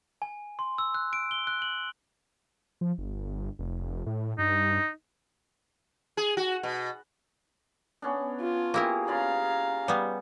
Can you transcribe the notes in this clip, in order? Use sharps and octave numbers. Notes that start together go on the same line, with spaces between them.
G#5
C6
E6
F#6
D7
G7
F#6
F#7
F3
G1
F1
A2
G2 D#4
G#4
F#4
B2
B3 C#4 D4
F4
A#3 E4 G4 G#4 A#4
C#3 F4 D5 F5 A#5
G3 B3